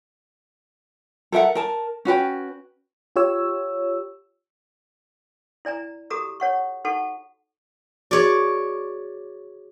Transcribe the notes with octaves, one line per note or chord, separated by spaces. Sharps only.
A4 A#4 E5 F#5
A#4 A5
C#4 F#4 B4 G5
F4 G4 C#5 E6
E4 D5 G#5 A#5
F#4 G4 A4 A#5 D6 D#6
C#5 F#5 C#6
D#4 F#4 A4 F#5 A5 C#6
F#4 G#4 C#5 D5